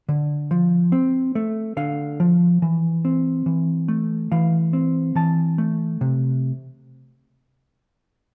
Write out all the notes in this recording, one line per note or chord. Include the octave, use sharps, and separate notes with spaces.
D3
F3
C4
A3
D3 F5
F3
E3
C4
E3
A3
E3 F5
C4
E3 A5
A3
C3